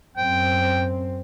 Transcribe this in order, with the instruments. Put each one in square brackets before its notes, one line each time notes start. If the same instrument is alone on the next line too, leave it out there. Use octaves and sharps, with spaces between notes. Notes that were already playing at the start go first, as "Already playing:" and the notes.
[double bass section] F#2 C4 [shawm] G5